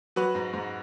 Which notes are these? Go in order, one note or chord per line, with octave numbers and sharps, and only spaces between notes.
F#3 F#4 B4
G#2
G#2